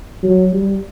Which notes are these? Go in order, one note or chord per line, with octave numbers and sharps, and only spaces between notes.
F#3
G3